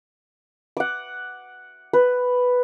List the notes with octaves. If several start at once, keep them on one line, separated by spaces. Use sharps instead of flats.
F#5 D6
B4